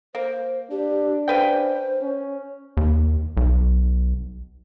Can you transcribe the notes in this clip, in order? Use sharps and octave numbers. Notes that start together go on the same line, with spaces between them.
A#3 C5
D4 G4
C#3 B4 C5 G5
C#4
D#2
B1